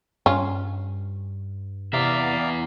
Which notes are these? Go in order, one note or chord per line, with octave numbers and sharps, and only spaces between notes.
G2 C#4 F4
E2 C3 D5 E5 F5 A#5